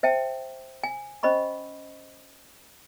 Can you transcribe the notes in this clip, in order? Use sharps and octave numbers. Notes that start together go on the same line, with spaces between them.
C5 E5 G5 A5
G#5
C#4 C5 D#5 B5 C#6